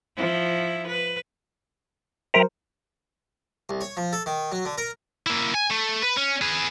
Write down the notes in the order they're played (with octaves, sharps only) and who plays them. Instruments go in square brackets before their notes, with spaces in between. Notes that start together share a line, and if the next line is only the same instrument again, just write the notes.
[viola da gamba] F3 E4
B4
[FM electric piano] F#3 A#4 C5 [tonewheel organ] E5 G5 A#5
[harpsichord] C2
C#5
F3
A4
D#3
F#3
D3
A#4
[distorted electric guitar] A#3 E4
G#5
A3
B4
C#4
G#4 B4